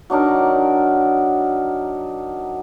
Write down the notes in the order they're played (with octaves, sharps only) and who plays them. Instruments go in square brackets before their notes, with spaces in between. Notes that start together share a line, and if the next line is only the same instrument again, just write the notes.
[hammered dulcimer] F#3 D4 D#4 A#4